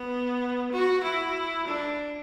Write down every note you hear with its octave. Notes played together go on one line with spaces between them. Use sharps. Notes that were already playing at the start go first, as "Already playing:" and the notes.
Already playing: B3
F#4
E4
D4